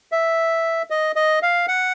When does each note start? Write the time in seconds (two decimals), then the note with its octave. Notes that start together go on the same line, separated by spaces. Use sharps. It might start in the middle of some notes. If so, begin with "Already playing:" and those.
0.12 E5
0.90 D#5
1.16 D#5
1.42 F5
1.68 F#5